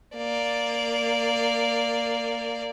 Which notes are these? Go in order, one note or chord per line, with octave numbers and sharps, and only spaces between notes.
A#3 D5